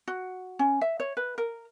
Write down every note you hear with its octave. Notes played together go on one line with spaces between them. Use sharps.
F#4
C#4
E5
C#5
B4
A#4